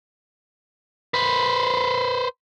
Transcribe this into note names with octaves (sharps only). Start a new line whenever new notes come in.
B4 C5